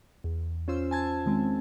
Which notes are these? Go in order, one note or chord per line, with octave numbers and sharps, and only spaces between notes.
E2
C#4 F4 C5 E6
G#5 A5 G#6
D#3 G#3 C4